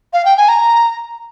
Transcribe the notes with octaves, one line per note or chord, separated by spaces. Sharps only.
F5
G5
G#5
A#5